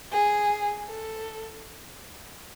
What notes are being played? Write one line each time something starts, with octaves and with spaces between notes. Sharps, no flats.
G#4
A4